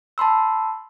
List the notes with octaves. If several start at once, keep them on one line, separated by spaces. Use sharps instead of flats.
A5 B5 C6 E6